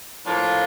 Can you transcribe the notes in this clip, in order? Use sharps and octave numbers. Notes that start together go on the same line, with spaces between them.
A2 F3 A#3 D4 F4